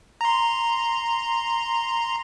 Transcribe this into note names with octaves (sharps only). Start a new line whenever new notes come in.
A#5 C6